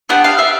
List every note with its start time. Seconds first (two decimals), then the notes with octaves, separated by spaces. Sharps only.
0.09 B3 D4 G4 F#5
0.24 F5
0.39 E5